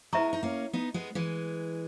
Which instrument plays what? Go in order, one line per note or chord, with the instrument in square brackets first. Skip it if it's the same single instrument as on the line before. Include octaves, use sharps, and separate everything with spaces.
[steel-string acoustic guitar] G#3 B3 [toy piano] E4 B4 E5 A#5 C#6
[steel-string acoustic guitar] D#4
A#3 C#4
B3 D#4
G#3 B3
E3 G#3